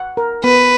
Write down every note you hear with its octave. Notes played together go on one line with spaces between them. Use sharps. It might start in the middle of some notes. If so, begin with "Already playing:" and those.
Already playing: F#5
A#4
B3 B4